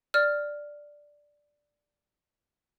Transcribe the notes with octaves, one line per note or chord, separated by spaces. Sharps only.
D5 F6